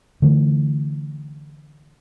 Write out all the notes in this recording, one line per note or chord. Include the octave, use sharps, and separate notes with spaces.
D3 E3 A3